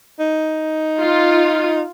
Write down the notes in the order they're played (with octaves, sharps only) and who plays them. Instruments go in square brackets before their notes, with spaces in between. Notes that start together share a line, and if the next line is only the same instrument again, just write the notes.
[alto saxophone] D#4
[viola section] F4